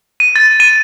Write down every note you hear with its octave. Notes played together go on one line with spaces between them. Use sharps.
D#7
A6
D#7